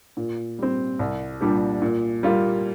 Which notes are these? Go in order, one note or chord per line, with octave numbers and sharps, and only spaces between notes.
A#2
G3 C4
C2
A#2 G3 D4 G4
A#2
G3 A#3 F4